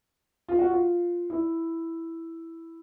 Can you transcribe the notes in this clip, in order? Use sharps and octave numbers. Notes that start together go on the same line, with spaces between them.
F4
F#4
F4
E4